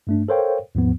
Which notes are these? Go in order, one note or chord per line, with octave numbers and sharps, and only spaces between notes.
G2 A3 D4
A4 A#4 C5 C#5 F5 G5
D#2 G#2 F3 B3